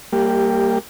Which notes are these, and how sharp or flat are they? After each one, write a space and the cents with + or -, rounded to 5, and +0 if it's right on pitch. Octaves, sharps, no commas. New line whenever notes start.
G3 -10 A#3 -15 G4 +10